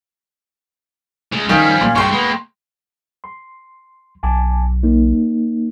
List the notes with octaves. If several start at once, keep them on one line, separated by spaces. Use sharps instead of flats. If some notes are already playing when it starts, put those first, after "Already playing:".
C#3 G#3
D#3 F3 G3 C#4 F5
A#2
G2 C#3 G5 C6 C#6
G#3 A#3 B3 B5
C6
B1 G#5 A5 D6
A#3 D#4